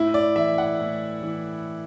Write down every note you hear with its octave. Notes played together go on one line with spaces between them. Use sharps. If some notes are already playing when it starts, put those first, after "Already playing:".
Already playing: A2 E4
D5
E3 E5
F#5
A2
E3